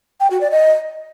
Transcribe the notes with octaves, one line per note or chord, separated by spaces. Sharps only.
G5
F#4
D5
D#5